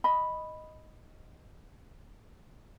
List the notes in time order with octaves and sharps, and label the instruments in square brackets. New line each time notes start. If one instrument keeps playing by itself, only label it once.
[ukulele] D#5 B5